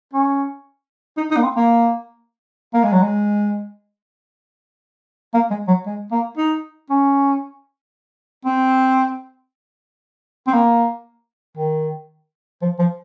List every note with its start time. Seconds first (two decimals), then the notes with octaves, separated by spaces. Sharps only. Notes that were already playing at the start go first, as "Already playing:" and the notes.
0.13 C#4
1.17 D#4
1.31 D#4
1.37 A#3
1.43 C4
1.56 A#3
2.74 A#3
2.84 G#3
2.92 F#3
3.03 G#3
5.34 A#3
5.51 G#3
5.68 F#3
5.86 G#3
6.11 A#3
6.37 D#4
6.90 C#4
8.45 C4
10.47 C4
10.53 A#3
11.57 D#3
12.62 F3
12.79 F3